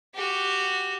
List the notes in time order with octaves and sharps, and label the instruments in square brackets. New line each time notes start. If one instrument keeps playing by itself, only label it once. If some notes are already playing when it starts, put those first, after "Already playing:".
[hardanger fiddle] F#4 G4